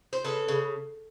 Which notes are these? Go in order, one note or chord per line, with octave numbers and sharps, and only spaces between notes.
C5
C#3 A4 B4
C#3